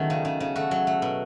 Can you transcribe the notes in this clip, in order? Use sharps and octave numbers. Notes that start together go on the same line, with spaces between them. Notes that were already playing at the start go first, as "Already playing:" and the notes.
Already playing: D#3 F#3 A3 B3 C#4 G#4 B4
C#3
C#3
C#3
A3 F#4
F#3
A3
B2